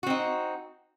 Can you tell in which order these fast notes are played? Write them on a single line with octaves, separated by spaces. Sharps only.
F#4 C4 D#4